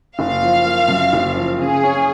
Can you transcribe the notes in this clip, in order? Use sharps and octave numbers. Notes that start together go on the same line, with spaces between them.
F#1 F5
F3
A#3
F#2
F#1
F3
C#3 G#4
C#4